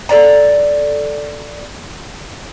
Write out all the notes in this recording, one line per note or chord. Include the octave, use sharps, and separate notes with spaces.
A4 B4 D5 A#5